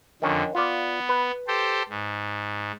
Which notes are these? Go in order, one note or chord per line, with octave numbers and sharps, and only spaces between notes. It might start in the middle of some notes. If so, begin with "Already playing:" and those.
F2 D3 D#3 C#4
B3 F4 D5
B4
G4 A4 C5
G#2